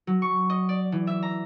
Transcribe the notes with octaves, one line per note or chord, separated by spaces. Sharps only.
F#3
C#6
D#5
D5
E3
E5
A#5